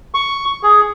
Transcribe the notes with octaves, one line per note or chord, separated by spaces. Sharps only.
C#6
G#4